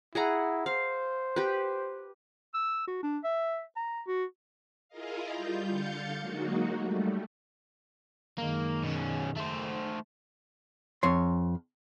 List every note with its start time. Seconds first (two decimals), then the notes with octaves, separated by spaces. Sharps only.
0.15 E4 G#4 F#5 A#5
0.66 C5 F5
1.36 G4 B4
2.54 E6
2.87 F#4
3.03 D4
3.24 E5
3.76 A#5
4.07 F#4
4.89 E4 F4 G#4 A#4 D#5 F5
5.31 G3 F4 G6
5.69 D3 F5 G6 A6 C#7
6.19 F#3 G#3 A#3 D#4 F#4
6.78 G3 A3
8.38 F#2 D#3 G#3 A#3
8.84 B2 C#4
9.36 A3 C5
11.03 F2 C#5 C6